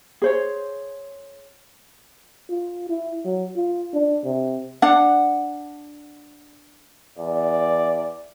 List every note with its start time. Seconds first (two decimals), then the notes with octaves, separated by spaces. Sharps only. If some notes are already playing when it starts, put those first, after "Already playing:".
0.22 G#4 C5 C#5
2.50 F4
2.89 E4
3.25 F#3
3.56 F4
3.94 D4
4.25 C3
4.82 D4 F#5
7.18 E2 D5